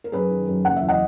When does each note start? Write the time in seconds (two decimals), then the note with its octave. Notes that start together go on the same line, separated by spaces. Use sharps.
0.04 A#4
0.12 F#2 G#4 B4
0.31 D#3
0.47 F#2
0.65 F#1 F#5
0.76 E5
0.82 E2
0.88 D#5 F#5